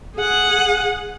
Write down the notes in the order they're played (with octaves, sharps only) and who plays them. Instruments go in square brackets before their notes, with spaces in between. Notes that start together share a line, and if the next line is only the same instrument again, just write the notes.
[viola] G#4 F#5